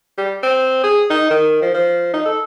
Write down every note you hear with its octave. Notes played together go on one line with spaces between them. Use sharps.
G3
C4
G#4
D#4
D#3
F3
F3
D#4
A4